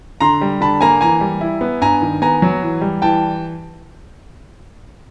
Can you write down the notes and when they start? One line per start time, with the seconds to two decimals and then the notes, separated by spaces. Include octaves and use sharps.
0.20 D3 A#5 C6
0.41 G3
0.61 D3 A5 B5
0.81 A#3 G#5 A#5
1.01 E3 G#5 A#5
1.21 G3
1.41 E4
1.61 B3
1.81 G2 G#5 A#5
2.02 D#3
2.22 B3 G#5 A#5
2.42 F#3
2.62 E3
2.81 G3
3.02 E3 G5 A5